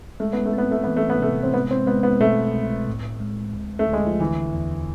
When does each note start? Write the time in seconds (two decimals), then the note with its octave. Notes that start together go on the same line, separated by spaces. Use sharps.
0.20 G#3 A3
0.33 B3
0.46 A3
0.53 B3 C4
0.71 A3
0.84 E3 B3
0.97 A3
1.10 B3
1.20 C3 A3
1.43 C4
1.53 G#3 B3
1.71 C4
1.86 G#3 B3
2.03 B3
2.20 B2 A3
2.53 C2
2.87 A2
3.20 G#3
3.53 D2
3.79 A3
3.87 D2
3.93 G#3
4.06 F3
4.20 D3 E3
4.53 E2